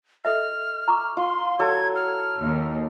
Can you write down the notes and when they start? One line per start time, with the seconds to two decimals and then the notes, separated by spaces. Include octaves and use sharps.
0.25 A4 D#5 E5 F6
0.88 A#5 C#6 D6
1.17 F4 C6
1.59 F#3 A4 G#6
1.95 F6
2.41 D#2